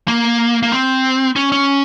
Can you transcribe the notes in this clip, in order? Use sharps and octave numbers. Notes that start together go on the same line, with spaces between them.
A#3
A#3
C4
C#4
C#4